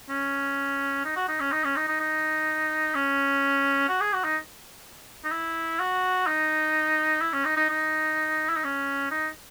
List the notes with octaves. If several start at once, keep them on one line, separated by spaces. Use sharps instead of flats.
C#4
D#4
F#4
D#4
C#4
D#4
C#4
D#4
D#4
D#4
C#4
F#4
G#4
F#4
D#4
D#4
E4
F#4
D#4
E4
C#4
D#4
D#4
D#4
E4
D#4
C#4
D#4